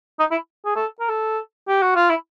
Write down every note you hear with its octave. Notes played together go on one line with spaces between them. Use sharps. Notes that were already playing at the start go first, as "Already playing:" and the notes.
D#4
E4
G#4
A4
A#4
A4
G4
F#4
F4
E4